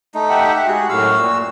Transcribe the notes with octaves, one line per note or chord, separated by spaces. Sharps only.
A3 D#4
G4 E5 F#5
G#3 F#4 G#4
F#2 A2 F#4 F5 E6
A#2